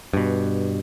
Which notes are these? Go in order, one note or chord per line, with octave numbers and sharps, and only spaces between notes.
G2 B2